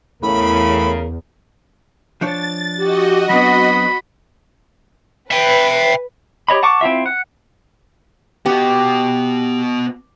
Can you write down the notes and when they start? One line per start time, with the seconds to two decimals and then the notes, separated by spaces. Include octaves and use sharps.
0.23 E2 A2 C#3 A#4 B5
2.21 F3 D4 C#5 A6
2.77 F#4 G4 D#5
3.29 F#3 B3 C4 D4 B5
5.31 B4 E5 G5
6.48 G4 C#5 D#5 B5
6.63 F#5 A5 C#6 D6
6.81 C4 E4 F4 E5
7.06 F#5
8.46 B3 F#4 G4